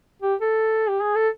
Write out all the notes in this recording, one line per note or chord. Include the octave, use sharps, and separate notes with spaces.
G4
A4
G4
G#4
A4